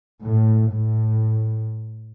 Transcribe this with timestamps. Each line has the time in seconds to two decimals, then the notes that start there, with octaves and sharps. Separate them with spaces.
0.20 A2
0.70 A2